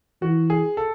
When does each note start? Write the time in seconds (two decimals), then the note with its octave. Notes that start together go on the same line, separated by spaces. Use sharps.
0.22 E3 F#4
0.50 G#4
0.77 A4